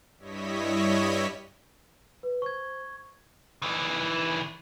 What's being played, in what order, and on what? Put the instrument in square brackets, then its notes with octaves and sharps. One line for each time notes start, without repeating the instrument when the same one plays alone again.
[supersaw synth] G2 G3 E4 C#5 D#5 B6
[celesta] B4
[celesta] C5 [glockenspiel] C#6 G#6
[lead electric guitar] D#3 E3